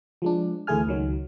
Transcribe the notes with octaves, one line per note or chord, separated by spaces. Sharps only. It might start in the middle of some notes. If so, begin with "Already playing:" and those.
F3 G#3 D4
D2 E3 A3 G#4 G#5 F6
C#2 D#3 F#3